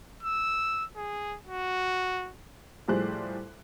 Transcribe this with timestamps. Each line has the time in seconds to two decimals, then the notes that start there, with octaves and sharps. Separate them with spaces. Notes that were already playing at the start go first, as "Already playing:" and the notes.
0.23 E6
0.96 G#4
1.47 F#4
2.88 A2 F3 G3 G#4 C5 F#6